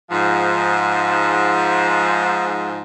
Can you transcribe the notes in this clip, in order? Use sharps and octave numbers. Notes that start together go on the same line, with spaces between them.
G#2 F3